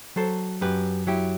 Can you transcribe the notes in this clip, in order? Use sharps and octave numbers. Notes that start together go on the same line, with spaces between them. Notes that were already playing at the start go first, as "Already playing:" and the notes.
F#3 A4 C5
F#2 G4 B4
F#3 E4 G4